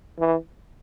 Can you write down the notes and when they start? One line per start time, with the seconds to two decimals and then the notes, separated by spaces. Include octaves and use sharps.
0.19 E3